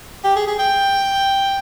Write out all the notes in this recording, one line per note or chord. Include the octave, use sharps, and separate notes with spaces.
G4
G#4
G#4
G5